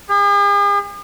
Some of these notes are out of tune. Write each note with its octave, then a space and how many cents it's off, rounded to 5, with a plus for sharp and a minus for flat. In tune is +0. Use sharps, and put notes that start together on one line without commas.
G#4 -45